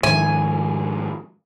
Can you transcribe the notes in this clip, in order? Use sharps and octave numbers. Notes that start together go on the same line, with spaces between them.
G#2 D#3 F3 G#5